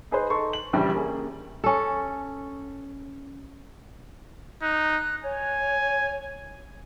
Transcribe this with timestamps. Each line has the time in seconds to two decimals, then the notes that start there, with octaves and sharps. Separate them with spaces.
0.11 D#4 G#4 B4 C5
0.30 D#4 A4 C6 C#6
0.53 F#7
0.73 A#1 C#3 E3 G3
0.94 A#3 C#4 G#4
1.64 C#4 A4
4.62 D#4 F#6
5.24 C#5 G#5